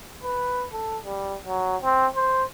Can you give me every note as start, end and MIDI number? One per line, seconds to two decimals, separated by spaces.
0.23 0.66 71
0.72 0.97 69
1.04 1.36 55
1.46 1.77 54
1.82 2.07 60
2.16 2.43 72